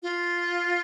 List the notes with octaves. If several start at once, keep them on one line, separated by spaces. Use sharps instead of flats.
F4